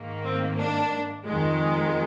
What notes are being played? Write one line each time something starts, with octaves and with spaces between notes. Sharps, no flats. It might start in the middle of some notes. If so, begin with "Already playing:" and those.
Already playing: G#2 D#3 A#3
C4
D4
F2 D#3 G#3